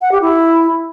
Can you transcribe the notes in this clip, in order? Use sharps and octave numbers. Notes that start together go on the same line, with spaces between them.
F#5
G4
E4